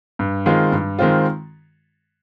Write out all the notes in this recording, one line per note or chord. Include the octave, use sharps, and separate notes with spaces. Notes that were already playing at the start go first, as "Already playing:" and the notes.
G2
D#3 G#3 C4 F4
G2
D#3 G#3 C4 F4